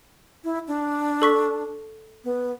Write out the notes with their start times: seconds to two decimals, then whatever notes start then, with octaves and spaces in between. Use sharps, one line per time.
0.44 E4
0.68 D4
1.22 A4 C#6 B6
2.24 B3